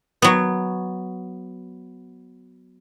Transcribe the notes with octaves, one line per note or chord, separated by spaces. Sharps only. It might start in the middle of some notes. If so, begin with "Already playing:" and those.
F#3 B3